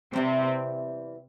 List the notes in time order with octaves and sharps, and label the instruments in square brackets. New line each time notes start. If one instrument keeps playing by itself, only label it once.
[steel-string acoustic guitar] E2 E3 G3 [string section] C3 C4